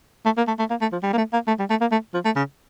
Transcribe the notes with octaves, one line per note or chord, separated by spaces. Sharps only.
A3
A#3
A3
A3
A#3
A3
F3
G3
A#3
A3
A#3
A3
G3
A3
A#3
A3
F3
A3
C#3